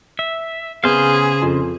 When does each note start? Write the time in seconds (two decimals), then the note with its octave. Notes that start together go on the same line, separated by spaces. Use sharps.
0.19 E5
0.84 C#3 B3 G#4 C5 F5
1.42 F2 C6